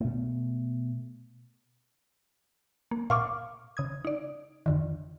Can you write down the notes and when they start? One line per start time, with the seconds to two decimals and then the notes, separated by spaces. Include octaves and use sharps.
0.01 B2 A3
2.91 A#3
3.10 A#2 F5 C#6 D6 F6
3.77 C#3 D#6 G#6
4.05 D#4 D5
4.66 F2 D3 D#3